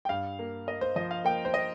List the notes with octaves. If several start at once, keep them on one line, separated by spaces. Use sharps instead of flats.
G5
G2 F5
A#3
A#3 D#5
C5
F3 D#5
F5
A#3 G5
C5
D#5